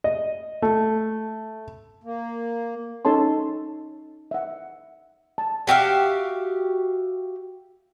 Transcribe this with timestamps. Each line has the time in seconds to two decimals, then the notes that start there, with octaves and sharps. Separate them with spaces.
0.04 D#5
0.62 A3
2.04 A#3
3.05 C#4 D#4 A4 C#5 A5 C6
4.31 E5 F#5
5.38 A5
5.67 F#4 G4 E5 F5